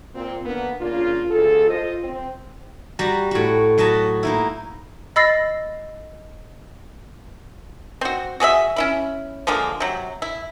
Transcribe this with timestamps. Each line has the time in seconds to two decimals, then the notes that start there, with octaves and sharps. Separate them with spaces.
0.15 A#2 C4
0.45 D3 A#3 B3
0.80 C#3 A#3 D4 F4
1.30 D2 F4 G#4 A4
1.69 F4 C5 D#5
2.03 C4
2.99 G3 F#4 A#5
3.31 A2 F#4
3.78 F#3 F#4 D#5 A5 B5
4.23 A#3 D#4 E4
5.16 D#5 B5 E6 A6 A#6 C7
8.01 C4 F#4
8.40 F#4 G#4 B4 E5
8.76 C#4 E4 B5
9.47 D3 F3 G#3 A#3
9.80 C3 F#3
10.22 E4